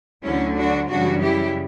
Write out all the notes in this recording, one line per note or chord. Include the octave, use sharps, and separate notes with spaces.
D2 D3 F#3 C#4 E4
D4 F#4
F#2 C#3 E3 G3 D4 F#4
E4 G4